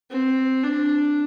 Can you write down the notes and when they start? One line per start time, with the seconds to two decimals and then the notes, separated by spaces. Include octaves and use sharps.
0.10 C4
0.64 D4